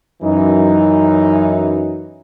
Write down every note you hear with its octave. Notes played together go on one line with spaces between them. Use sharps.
F#2 E3 D#4